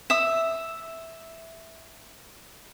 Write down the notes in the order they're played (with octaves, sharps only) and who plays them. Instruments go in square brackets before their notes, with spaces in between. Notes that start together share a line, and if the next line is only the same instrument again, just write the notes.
[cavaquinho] E5 D#6